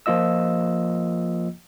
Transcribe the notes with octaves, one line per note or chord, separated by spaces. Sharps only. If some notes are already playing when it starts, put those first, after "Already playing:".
F3 A#3 F4 D#5 E6